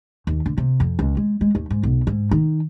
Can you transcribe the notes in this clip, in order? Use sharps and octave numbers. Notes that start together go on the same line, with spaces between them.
D#2
D3
C3
F2
C#2
G#3
G#3
D#2
G#2
B1
G#2
D#3